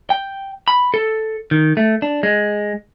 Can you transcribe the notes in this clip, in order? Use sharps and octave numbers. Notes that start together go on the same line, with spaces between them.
G5
B5
A4
D#3
A3
D4
G#3